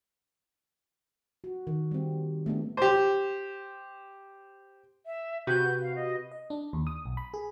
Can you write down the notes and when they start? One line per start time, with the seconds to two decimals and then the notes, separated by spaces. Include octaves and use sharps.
1.44 F#4
1.67 D#3
1.91 G3 C4
2.46 A3 B3 D4
2.77 G4 C5
5.06 E5
5.47 C3 F#4 B4 G6
5.82 F5
5.96 D#5
6.31 D#5
6.50 D4
6.73 D#2
6.87 D#6
7.05 B1
7.17 B5
7.34 G#4